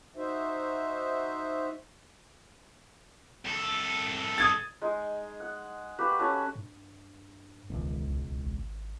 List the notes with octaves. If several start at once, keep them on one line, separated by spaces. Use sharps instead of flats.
D#4 F#4 C5 E5
C2 A4
D#6 G#6 A6
G#3 D#4
F#5
A#3 F#4 G4 B4
C#4 F#4 A4
G2
E1 C#2 D#3
C2
G#1